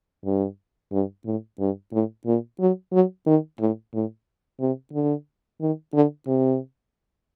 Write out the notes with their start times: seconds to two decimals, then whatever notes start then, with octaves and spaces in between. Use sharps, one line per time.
0.25 G2
0.92 G2
1.25 A2
1.59 G2
1.92 A2
2.26 A#2
2.59 F#3
2.92 F#3
3.26 D#3
3.59 A2
3.93 A2
4.60 C3
4.93 D3
5.60 D#3
5.94 D3
6.27 C3